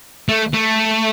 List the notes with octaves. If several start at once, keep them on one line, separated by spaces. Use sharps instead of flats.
A3
A3